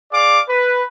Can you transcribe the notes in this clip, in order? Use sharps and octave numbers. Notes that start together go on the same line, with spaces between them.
G#4 D5 F5 D6
B4